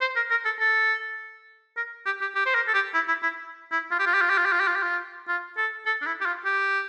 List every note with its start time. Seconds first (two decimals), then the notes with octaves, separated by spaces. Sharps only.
0.01 C5
0.16 A#4
0.31 A#4
0.45 A4
0.59 A4
1.77 A#4
2.06 G4
2.21 G4
2.36 G4
2.46 C5
2.55 A#4
2.68 A4
2.74 G4
2.94 E4
3.08 E4
3.23 E4
3.72 E4
3.91 F4
4.00 G4
4.07 F4
4.14 G4
4.22 F4
4.30 G4
4.38 F4
4.46 G4
4.53 F4
4.61 G4
4.68 F4
4.76 G4
4.83 F4
5.28 F4
5.57 A4
5.86 A4
6.02 D4
6.07 E4
6.21 G4
6.26 F4
6.45 G4